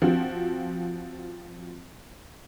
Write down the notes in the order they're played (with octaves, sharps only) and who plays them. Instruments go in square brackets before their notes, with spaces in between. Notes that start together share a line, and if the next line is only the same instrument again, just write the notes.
[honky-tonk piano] F3 C4 F#4